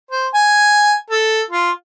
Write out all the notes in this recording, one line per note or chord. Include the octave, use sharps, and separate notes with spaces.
C5
G#5
A4
F4